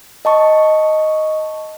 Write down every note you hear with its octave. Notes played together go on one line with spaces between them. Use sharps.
D#5 A5 C#6